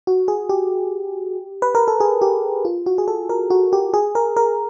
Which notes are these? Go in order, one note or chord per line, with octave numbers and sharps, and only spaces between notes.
F#4
G#4
G4
B4
A#4
A4
G#4
G4
F4
F#4
G#4
A4
A#4
F#4
G4
G#4
A#4
A#4